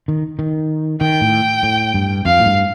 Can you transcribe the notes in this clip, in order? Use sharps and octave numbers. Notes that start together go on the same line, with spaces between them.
D#3
D#3
D#3 G5
A2
A2
G2
F2 F5
A2
G2